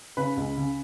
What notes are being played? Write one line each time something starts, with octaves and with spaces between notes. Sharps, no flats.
C#3 B4
C#2
C#3